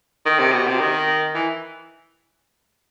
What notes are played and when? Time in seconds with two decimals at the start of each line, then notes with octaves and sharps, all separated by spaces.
0.26 D#3
0.39 C3
0.52 B2
0.67 C3
0.80 D#3
1.35 E3